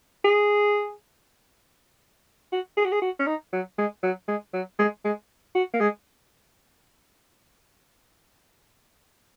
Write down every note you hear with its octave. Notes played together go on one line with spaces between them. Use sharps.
G#4
F#4
G#4
F#4
G#4
F#4
C#4
D#4
F#3
G#3
F#3
G#3
F#3
G#3
G#3
F#4
A#3
G#3